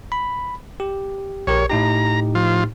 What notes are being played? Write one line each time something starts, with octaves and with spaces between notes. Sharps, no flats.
B5
G4
A#1 G4 A#4 C#5
A2 D#4 G4 A#5
F3 F4